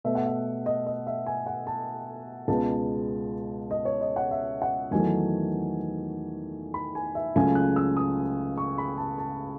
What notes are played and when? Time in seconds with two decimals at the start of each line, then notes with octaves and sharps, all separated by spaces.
0.04 B2 A3 E5
0.15 F#5
0.26 E5
0.66 D#5
0.86 D#5
1.07 E5
1.26 G#5
1.47 F#5
1.67 A5
2.48 C#2 B2 G#3 B3 A5
3.71 D#5
3.85 C#5
4.01 D#5
4.16 F#5
4.31 E5
4.62 F#5
4.91 E2 D#3 F#3 A3 G#5
6.74 B5
6.95 G#5
7.15 E5
7.36 C#2 C#3 F#3 A3 G#5
7.55 F#6
7.76 E6
7.97 D#6
8.58 C#6
8.78 B5
8.98 A5
9.18 A5